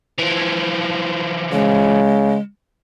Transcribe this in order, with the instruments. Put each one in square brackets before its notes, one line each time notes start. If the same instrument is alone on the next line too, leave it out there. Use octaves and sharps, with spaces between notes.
[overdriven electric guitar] E3 F3
[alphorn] C#3 [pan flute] G#3